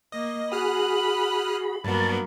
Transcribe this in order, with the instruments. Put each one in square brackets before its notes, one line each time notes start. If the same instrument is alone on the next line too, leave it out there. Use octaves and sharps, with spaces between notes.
[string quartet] A#3 [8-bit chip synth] D#5
[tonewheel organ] F#4 G#4 [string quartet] B5 [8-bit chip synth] D#6 F6 F#6
[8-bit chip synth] G2 F#4 [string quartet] F#3 A#3 B3 [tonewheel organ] A5